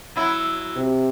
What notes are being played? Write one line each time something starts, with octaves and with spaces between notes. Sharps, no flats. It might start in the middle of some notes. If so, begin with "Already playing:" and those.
F#3 E4
C3